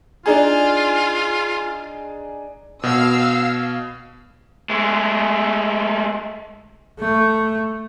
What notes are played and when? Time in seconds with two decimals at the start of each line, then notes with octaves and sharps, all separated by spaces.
0.26 D4 D#4 F4 G#4
2.83 B2 F5 E6
4.70 G#3 A3
7.00 A3